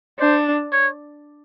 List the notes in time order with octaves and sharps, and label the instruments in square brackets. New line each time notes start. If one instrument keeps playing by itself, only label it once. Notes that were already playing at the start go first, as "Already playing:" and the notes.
[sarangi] D4 [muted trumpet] C5
[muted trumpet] C#5